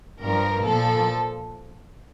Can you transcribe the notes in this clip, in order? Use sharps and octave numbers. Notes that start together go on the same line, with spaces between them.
G2 F3 A#4
A#2 F3 A4